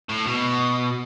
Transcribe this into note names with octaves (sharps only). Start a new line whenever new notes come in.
A2
B2